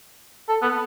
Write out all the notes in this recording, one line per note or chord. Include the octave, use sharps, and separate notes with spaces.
A4
B3